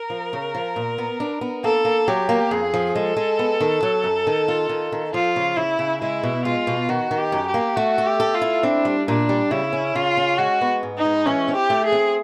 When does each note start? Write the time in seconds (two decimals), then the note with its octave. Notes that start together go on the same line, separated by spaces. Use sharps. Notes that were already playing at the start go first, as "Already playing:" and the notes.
Already playing: A#4
0.10 F3
0.33 C#3
0.55 F3
0.76 A#2
0.98 B3
1.20 D4
1.41 B3
1.64 A#3 A4
1.85 A#3
2.08 F#3 G4
2.29 A#3
2.51 F2 G#4
2.74 F3
2.96 G#3 A4
3.17 G#3
3.39 B3
3.61 D#3
3.83 F#3
4.04 F#2
4.27 D#3
4.48 F4
4.69 D#3
4.92 D#3
5.14 F3 F4
5.36 C#3
5.57 C#3 E4
5.79 C#3
6.01 G#3 E4
6.23 B2
6.45 G#3 F4
6.67 B2
6.89 D#3 F#4
7.11 D#3
7.18 G4
7.32 F#2
7.47 G4
7.54 A#3
7.76 A3 F#4
7.98 A4
8.06 G4
8.20 A4
8.34 F4
8.42 E4
8.63 C4 D4
8.85 G3
9.08 A#2 D4
9.29 G3
9.51 C#3 E4
9.73 C#4
9.95 C#3 F4
10.17 C#4
10.38 G#3 F#4
10.61 B3
10.83 G#2
10.98 D#4
11.05 G#3
11.26 E3 C#4
11.48 C4
11.55 G4
11.70 A3
11.85 G#4
11.92 C4